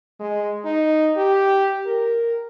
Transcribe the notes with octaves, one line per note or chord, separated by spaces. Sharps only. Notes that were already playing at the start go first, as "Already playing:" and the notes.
G#3
D#4
G4
A#4